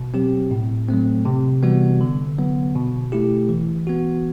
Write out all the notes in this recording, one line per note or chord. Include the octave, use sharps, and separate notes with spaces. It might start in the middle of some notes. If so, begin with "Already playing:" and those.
Already playing: B2
F#3 C4 G4
A2
F#3 A3 C4
C3
E3 G3 B3 F#4
D3
F#3 B3
B2
A3 E4 G4
E3
B3 F#4